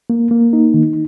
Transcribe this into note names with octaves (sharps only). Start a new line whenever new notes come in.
A#3
A#3
D#4
D#3